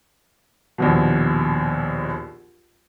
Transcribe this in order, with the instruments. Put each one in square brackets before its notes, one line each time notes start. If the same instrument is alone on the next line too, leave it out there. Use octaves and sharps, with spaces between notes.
[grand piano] A#1 D#2 B2